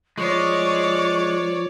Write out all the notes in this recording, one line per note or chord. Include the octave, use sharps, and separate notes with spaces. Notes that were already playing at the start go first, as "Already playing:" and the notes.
F3 G#3 C#5 D5 C#6